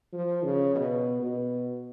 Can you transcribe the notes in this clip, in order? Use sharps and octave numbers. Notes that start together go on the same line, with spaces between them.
F3
C#3
B2
B2